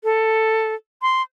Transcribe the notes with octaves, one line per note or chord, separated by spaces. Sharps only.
A4
C6